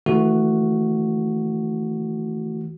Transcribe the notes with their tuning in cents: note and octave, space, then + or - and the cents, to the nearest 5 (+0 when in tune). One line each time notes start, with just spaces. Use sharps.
E3 -30 A3 +0 F#4 +0